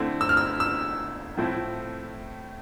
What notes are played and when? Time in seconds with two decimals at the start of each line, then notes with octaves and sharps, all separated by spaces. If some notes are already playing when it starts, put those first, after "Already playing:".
Already playing: D3 A3 C4 E4
0.21 E6
0.29 F6
0.37 E6
0.60 E6
1.37 A2 F3 A3 C4 E4